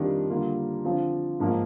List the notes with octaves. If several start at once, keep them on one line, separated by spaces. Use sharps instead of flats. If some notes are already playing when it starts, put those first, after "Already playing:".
Already playing: F2 D#3 G3 D4 F4
D3 G3 A#3 F4
D3 F3 C4 F4
G#2 F3 A#3